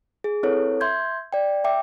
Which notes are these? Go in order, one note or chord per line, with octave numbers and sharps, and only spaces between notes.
G#4
C4 E4 A4 B4 C#5
E5 C6 G6 G#6
D5 G5
E5 G5 D6